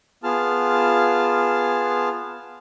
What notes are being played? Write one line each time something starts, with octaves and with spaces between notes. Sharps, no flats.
B3 F4 G#4 A5 F6